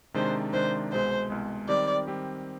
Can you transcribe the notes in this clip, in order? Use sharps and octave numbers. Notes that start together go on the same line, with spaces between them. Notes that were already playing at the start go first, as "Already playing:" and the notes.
C3 D#3 G#3 D4 C5
C3 D#3 G#3 D4 C5
C2 B2 G#3 C5
C2 B2 G#3
D#3 G3 C4 G4 D5
D#3 G3 C4 G4